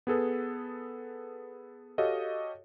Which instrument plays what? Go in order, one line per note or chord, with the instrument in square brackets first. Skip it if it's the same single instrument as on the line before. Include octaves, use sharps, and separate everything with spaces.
[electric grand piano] B3 G#4 A4 B4
F#4 G4 A4 C#5 D#5 F5